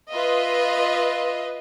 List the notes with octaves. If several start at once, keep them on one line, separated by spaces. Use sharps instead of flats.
F4 B4 D#5 E5